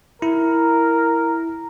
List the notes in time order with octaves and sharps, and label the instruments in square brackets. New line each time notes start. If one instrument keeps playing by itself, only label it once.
[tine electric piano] E4 [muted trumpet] A#4